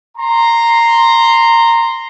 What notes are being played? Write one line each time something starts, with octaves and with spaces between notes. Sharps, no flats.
A#5 C6